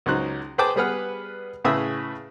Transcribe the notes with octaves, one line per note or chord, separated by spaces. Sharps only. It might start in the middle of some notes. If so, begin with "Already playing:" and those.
C#2 F#3 C#4 D#4 C5 F#6
G#4 B4 C5 G5 A5 D6
G3 B3 G#4 B4 F#5 F6
A2 C#3 G#4 B4 E5 D#6